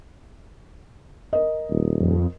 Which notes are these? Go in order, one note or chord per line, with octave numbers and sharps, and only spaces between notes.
A#4 D#5
D#1
F2